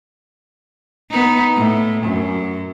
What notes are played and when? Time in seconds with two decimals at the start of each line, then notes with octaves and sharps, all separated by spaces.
1.11 B3 D#4
1.55 A2
2.04 F#2